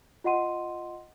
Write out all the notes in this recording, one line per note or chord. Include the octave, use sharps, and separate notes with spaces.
F4 D#5 F#5 C6 D#7